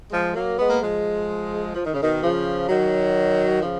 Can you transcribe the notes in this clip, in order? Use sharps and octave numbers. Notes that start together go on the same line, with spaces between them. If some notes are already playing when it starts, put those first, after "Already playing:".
F3 G#3
F#3 A#3
G#3 B3
A#3
F3 G#3
F3
D#3
C#3
B2 D#3
C#3 F3
D#3 F#3
C#3 F3